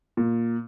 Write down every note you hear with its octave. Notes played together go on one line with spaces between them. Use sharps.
A#2